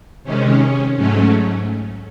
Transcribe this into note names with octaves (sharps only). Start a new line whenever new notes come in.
C3 D#3 G#3 C#4
G#2 F#3 A3 C#4